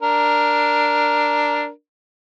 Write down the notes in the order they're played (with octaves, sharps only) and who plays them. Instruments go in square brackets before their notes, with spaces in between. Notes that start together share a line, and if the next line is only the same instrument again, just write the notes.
[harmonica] D4 A#4